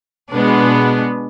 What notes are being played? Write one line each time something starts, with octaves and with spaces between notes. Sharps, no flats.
B2 G#3 B3 D4